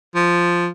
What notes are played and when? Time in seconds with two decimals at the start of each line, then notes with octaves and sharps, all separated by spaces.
0.15 F3